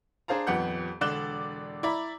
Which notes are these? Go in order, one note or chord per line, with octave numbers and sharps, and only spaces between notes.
D4 G#4 C5 F5 A5 A#5
D#1 F2 B3 G4 F#5 G6
E1 D3 D5 F#6 E7 G7
E4 D5 A#5 B5